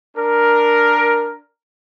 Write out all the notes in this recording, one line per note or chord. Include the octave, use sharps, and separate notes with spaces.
D4 A#4